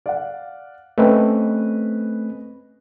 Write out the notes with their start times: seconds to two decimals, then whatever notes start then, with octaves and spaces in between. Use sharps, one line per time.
0.06 D5 F5 F#5
0.98 A3 C4 C#4 B4 D#5